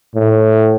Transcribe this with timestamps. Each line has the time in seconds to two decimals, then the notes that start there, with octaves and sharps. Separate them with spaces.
0.15 A2